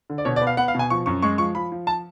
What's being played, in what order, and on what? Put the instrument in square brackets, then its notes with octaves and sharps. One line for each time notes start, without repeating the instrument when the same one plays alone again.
[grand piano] D3
D5
B2 C#5
D5
B3
F5
B3 F#5
F5
B2 G#5
F3 C#6
F#2 C#6
G#3 C#6
F3 C#6
F3 B5
F3
A5